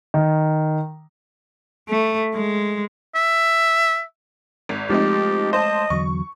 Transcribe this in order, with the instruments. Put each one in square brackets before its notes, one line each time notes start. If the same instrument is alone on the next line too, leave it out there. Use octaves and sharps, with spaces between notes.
[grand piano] D#3
[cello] A3
G#3
[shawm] E5
[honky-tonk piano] G#1
[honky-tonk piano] F3 C4 D#4 [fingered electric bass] G#3 A3 [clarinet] G4
[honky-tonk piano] C5 A5 [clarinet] D#5
[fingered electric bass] E2 D3 F#3 [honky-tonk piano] C#6